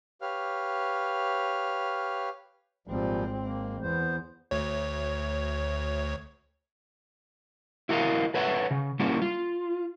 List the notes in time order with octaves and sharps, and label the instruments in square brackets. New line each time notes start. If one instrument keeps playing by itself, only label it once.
[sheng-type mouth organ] G4 B4 C#5 F5 F6
[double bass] G#1 C4 [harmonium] A#2 F3 G3
[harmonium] A#3
[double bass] E2 [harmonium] B3 C5
[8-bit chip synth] D2 C#5
[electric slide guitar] E4 F#4 A#4 D5 D#5 F5
A4 B4 C#5 E5 F#5
C#3
G3 A#3 C#4 E4 F#4
F4